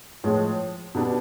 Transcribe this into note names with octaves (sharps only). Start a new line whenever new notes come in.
A2 F3 G#3
B2 G3 B3 D4